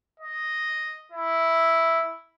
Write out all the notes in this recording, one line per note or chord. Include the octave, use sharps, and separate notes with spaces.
D#5
E4